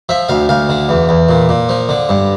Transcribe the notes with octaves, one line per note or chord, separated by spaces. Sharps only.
F3 E5
D2 F5
D2 F5
D3
E2
E2
A#2
A#2
F3
D3
G2